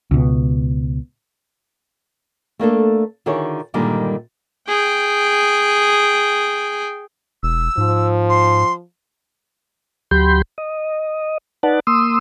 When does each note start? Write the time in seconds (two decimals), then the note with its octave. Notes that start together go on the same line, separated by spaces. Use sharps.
0.11 C#2 B2
2.59 A3 A#3 D4 A4
3.26 D3 D#3 E4 F#4 G#4 C#5
3.74 G2 A#2 D3 D#3 G3 G#3
4.68 G#4 G5
7.43 E1 E6
7.78 G#2 F3
8.29 C6
10.11 D2 F#3 G4 B5 C6 G6
10.58 D#5
11.63 D#4 B4 D5 F#5 A5
11.87 A#3 C6 D#6 E6